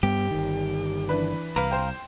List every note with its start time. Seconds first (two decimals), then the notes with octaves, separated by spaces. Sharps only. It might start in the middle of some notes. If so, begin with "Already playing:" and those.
0.03 G2 G3 B3 G4
0.31 G1 D#3
1.09 E3 D4 B4
1.56 C2 B4 F5 A#5
1.71 C5 G5